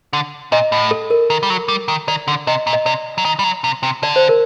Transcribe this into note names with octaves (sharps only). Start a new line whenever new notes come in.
D3
A#2 D#5
A2
A4
A#4
D#3
G3
F#3
G3
D#3
D#3 D5
D3
C3 D#5
A#2
D#5
C3 D5
F#3
D#3
G3
F#3
C3
C3
D3 D5
C5
A#4